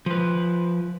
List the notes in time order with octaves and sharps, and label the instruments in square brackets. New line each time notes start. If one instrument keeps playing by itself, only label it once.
[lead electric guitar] F3 B4